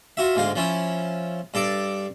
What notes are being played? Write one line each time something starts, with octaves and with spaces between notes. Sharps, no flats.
F4 F#4 E5
D2 G#2 G#3 F5
F3 C#4 E4
G2 A4 D5 D6